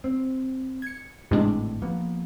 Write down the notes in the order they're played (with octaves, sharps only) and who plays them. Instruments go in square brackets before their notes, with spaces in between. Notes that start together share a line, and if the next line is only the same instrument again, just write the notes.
[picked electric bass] C4
[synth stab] G#6 C#7
[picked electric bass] G#1 A2 E3 [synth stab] C3 G#3 D4
[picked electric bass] F3 A#3 B3